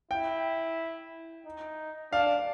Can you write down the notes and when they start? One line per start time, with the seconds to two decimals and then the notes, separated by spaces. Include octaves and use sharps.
0.11 E4 G5
1.46 D#4
2.12 D4 F5